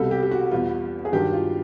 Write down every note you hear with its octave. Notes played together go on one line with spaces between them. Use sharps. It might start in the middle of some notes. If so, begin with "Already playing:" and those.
Already playing: C2 B2 G3 A4
G4
G4
F#4
E2 B2 G3 F4
G#4
G2 D#3 F#3 G4
F4